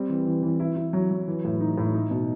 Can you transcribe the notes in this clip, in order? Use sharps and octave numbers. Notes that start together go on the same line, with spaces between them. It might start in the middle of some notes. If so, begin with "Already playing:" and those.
Already playing: G3 C4
E3
E3
E3
E4
E4
F#3
F#3
E3
A2
D#4
A2
D#4
B2